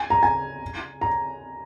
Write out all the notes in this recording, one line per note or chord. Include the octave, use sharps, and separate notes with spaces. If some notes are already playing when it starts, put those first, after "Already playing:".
Already playing: G#5
A#5
G#5
A#5